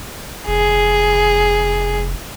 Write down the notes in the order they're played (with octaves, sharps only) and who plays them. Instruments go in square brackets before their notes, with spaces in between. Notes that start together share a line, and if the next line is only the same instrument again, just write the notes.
[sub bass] F1 [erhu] G#4